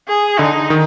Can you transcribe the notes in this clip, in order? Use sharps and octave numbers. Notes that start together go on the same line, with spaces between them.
G#4
D3 D#4
D#3